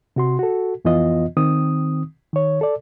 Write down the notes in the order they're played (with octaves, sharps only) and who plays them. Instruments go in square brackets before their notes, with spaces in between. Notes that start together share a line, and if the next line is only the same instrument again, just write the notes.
[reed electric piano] C3 F#4 C6
F#4 A4
F2 E3 B3 F4 D#5
D#3 C4 D#6
D#3 C#5
A4 D5